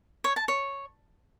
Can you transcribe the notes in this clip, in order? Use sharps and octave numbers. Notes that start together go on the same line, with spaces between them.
C#5
A5
C#5